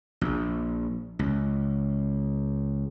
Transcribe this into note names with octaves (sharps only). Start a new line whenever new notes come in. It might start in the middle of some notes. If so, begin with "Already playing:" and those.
A#1
C#2